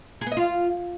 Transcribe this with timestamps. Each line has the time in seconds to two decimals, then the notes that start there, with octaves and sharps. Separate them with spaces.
0.21 G#4
0.26 B3
0.32 D#5
0.37 F4